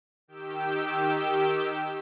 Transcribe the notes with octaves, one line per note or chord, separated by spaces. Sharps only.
D#3 G4 G5 E6